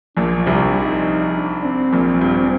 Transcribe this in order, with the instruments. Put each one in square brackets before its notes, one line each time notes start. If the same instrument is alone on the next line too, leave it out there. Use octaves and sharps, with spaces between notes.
[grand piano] A#1 A#2 [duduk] D4
[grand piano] C2 C3
[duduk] D#4
D4
C4
[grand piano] A#1 A#2
G2